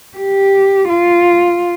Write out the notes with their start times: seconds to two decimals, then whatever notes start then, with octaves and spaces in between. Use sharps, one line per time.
0.18 G4
0.89 F4